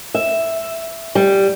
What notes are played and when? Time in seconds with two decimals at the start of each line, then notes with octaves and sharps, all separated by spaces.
0.15 E5
1.15 G3